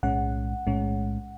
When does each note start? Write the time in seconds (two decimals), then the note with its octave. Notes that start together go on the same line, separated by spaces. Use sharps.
0.03 B1 A2 G#3 C#4 F#5
0.67 B1 A2 G#3 C#4